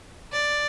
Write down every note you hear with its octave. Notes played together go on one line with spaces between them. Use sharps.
D5